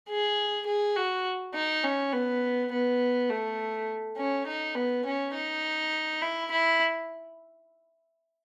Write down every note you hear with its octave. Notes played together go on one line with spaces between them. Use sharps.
G#4
G#4
F#4
D#4
C#4
B3
B3
A3
C#4
D#4
B3
C#4
D#4
E4
E4